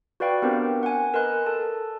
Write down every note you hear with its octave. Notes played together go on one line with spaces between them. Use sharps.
F#4 B4 D5 F5 G5 C#6
B3 C4 D4 G4 A#4 C5
F#5 G#5
A#4 B4 D#5 C6 F#6
A4 A5